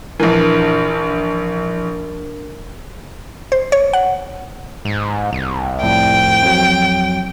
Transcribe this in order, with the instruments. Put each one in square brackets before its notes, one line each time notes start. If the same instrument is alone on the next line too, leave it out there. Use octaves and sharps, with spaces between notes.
[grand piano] A#1 E3 [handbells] D4 A#4
[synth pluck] C5
C#5
F#5
[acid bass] G#2
C2
[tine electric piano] F2 A2 F3 [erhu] G5
[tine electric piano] F2 F#3